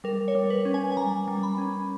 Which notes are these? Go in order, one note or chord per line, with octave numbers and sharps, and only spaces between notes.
G3 A#4
C#5
G3
B4
C#4
G#5
G#5
G3 A#5
G3
B5
C#4